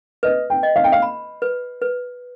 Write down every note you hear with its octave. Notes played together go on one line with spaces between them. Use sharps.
B4 D#5
G5
D#5
F5
G5
F5
B5
B4
B4